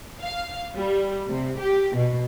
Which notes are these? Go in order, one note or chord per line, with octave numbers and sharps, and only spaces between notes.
F5
G3
C3
G4
B2